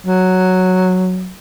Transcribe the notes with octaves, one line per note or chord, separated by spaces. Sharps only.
F#3